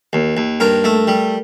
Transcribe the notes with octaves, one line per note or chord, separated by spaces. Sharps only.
D#2
D#2
G2 A#4
A3
G3